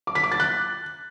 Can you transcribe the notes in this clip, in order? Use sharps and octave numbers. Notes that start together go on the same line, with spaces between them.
D6
B6
D6
A6
F#6